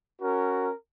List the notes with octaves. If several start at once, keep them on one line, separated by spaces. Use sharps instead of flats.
C#4 F#4 A#4